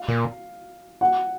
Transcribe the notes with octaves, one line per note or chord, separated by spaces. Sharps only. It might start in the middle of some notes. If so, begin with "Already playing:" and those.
Already playing: F5
A#2
F#5